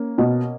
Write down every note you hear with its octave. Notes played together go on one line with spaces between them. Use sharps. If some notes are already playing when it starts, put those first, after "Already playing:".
Already playing: A#3 C#4
B2